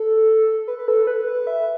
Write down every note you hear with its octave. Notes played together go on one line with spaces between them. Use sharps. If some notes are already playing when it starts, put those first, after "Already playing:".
Already playing: A4
B4
B4
A4
B4
B4
E5